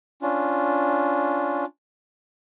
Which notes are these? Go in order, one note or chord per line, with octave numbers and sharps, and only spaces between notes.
C#4 D4 F4